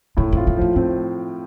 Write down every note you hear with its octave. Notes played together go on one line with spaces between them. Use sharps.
A2 D4
C4 F4
B3
F3 A3
A3 C4